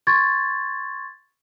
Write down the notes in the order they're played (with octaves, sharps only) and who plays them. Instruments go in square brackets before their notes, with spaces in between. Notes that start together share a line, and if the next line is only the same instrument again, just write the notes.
[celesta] C6 C#6 G#6 A6